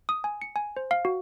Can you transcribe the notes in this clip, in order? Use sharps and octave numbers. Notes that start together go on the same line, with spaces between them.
D#6
G#5
C#7
G#5
C5
F5
F#4